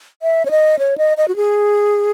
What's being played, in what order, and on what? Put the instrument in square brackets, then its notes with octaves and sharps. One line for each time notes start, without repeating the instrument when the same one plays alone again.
[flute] E5
C#5
D#5
C#5
D#5
D#5
F#4
G#4